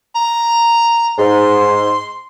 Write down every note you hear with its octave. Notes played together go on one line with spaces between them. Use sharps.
A#5
G#2 C6